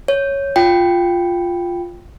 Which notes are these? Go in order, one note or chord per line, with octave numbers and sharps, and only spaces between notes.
C#5
F4 G5